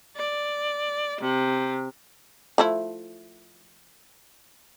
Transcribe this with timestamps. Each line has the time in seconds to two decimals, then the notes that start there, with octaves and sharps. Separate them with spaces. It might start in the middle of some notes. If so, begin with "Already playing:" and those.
0.16 D5
1.20 C3
2.58 F3 A3 E4